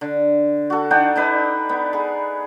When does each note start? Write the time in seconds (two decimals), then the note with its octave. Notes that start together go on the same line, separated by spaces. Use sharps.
0.01 D3
0.70 F#4 A4
0.91 D4 D#4 F#5 G5
1.16 D4 D#4 B4
1.69 B3
1.93 G#4